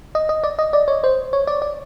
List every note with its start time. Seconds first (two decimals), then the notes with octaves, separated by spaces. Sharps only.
0.15 D#5
0.29 D#5
0.43 D5
0.59 D#5
0.73 D5
0.88 C#5
1.04 C5
1.33 C#5
1.47 D5
1.62 D5